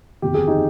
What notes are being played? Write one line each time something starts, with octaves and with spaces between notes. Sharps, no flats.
G1 F2 D#3 G4
G#4
D#4 G4